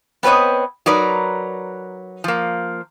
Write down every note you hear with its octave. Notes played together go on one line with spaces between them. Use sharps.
B3 C4 B4 C#5 D#5
F#3 D#4 A#4 B4 D5
F3 A#3